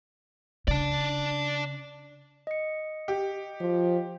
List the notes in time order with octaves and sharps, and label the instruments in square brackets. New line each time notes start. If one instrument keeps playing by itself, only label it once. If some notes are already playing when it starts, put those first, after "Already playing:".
[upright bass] C#3 [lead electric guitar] D5 A5
[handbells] D#5 C#7
[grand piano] G4
[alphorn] F3